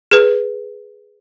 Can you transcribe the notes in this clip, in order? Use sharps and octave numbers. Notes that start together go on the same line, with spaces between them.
G#4 B4